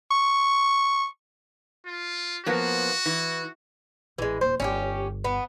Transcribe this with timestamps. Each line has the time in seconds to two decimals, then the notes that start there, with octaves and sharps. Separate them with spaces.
0.11 C#6
1.86 F4
2.46 F3 A#3 B3 F#4
3.06 E3
4.18 A1 E3 G#3
4.41 D#1 F2 C5
4.60 G1 C#4 D#4 G4
5.24 B3